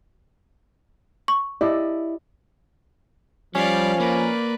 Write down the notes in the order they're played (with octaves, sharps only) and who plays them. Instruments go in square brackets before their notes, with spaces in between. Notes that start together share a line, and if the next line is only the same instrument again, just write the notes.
[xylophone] C#6
[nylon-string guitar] E4 [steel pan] G4 D5 D#5
[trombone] F3 [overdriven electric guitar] G3 [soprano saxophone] C#4 [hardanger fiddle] D5 F5
[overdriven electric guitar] A#3 [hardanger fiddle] B4 D5